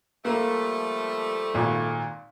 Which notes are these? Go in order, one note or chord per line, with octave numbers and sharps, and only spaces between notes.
F3 G3 A3 A#3
G#1 A#2